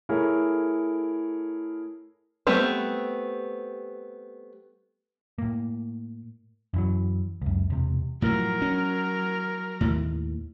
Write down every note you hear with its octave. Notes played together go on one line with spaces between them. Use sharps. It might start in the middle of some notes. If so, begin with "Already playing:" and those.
A3 E4 G#4 A#4 C#5
G3 A3 B3 C4
A2 A#3
F#2 E3 F#3
C#2 F#2
E1 C3
A2 F3 F#3 A#4
C#4
D#2 A2